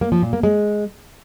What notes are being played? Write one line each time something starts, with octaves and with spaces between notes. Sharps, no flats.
A#3
F3
A#2
A#3
G#3